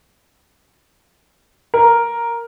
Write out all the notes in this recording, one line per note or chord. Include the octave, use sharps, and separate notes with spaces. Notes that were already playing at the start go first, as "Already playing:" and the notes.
A#4